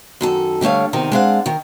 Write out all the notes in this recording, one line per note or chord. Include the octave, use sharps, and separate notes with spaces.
F#2 D#3 A4
D3 G3 A3 C#5 F5
E2 C3 D#3 D#4 A#4
G#3 C4 D4 D#5 F5 F#5
D#3 A#4